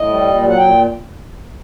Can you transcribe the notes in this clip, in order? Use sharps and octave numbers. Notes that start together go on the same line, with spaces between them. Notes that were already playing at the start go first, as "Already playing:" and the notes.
Already playing: A2 D#5
G3
A#2
F#3
F#5
A#2 G5